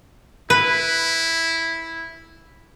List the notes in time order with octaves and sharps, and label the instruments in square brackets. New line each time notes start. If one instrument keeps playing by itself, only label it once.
[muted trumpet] E4 [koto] B4